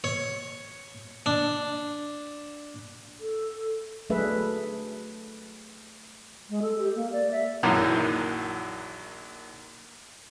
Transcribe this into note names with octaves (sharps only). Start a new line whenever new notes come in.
C#5
D4
A4
F#3 A3 D4 G#4 B4 E5
G#3
A4
G4
A#3
D5
E5
A#1 F#2 D#3 E3 F#3